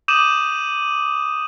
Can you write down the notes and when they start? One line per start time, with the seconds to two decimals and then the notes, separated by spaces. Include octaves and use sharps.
0.08 D6 D#6 G6 D#7 E7 F#7